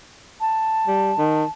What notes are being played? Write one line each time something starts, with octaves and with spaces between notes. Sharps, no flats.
A5
G3
D#3